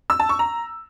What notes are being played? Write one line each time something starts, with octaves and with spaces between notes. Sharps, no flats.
E6
A5
C#6
A#5